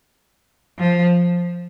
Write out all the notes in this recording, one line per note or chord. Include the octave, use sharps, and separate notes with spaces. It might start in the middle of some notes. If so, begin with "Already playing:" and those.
F3